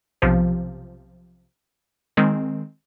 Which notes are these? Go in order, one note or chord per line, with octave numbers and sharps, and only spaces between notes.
B1 C3 F3
D#3 G#3 C4